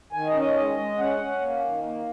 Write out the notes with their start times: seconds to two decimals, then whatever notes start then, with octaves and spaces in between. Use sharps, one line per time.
0.13 D#3 G#5
0.27 D#5
0.34 C#4
0.41 D#5
0.55 G#3 D#5
0.77 G#3
0.98 C#4 F#5
1.20 C#4
1.41 A#3
1.63 D#3
1.84 A#3